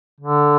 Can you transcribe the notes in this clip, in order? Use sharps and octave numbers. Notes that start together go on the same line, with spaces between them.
D3